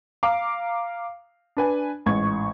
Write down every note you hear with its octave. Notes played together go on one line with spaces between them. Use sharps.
F5 A#5 D6
D4 B4 G#5
A1 G#2 C#6 G#6